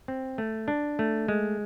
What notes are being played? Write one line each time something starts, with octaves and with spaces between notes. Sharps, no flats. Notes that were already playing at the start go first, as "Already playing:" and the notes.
C4
A3
D4
A3
G#3